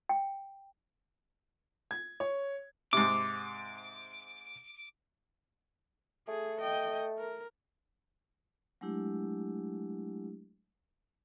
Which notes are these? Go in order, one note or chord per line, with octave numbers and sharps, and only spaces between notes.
G5
G#6
C#5
G#2 C3 D6
A3 G#4
D#5 G5
A#4
F#3 G#3 A3 D4 E4 G4